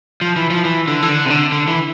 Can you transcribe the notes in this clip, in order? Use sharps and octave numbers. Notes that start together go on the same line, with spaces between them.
F3
E3
F3
E3
D3
E3
D3
C3
D3
D3
E3